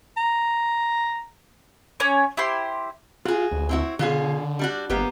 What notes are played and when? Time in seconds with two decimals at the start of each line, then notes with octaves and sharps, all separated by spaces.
0.17 A#5
2.00 C#4 C#5 D6
2.37 E4 G4 C5 C6
3.25 F4 F#4 G#4
3.52 D2
3.69 C4 E4 F#4
3.99 B2 D3 F4 G#4
4.59 G3 D4 F#4
4.90 G1 A#3 B3 G4